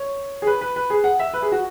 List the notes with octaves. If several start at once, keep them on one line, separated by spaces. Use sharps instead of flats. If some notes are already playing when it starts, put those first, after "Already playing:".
Already playing: C#5
G#4
B4
B4
B4
G#4
F#5
E5
B4
G#4
F#4